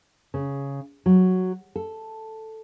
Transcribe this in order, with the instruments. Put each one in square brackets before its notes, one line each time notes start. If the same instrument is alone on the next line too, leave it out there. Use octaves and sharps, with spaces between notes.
[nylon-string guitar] C#3
F#3
A4